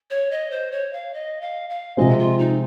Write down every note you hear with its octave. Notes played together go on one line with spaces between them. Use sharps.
C#5
D#5
C5
C#5
F5
D#5
F5
F5
C3 F3 G#3 C4 D#5
F4
D#4